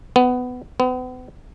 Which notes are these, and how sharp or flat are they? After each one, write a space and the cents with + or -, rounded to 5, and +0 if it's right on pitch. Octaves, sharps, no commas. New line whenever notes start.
B3 +15
B3 +40